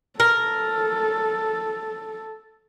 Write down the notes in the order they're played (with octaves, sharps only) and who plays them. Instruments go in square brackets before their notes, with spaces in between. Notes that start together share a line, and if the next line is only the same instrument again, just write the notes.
[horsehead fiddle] A4 [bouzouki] A#4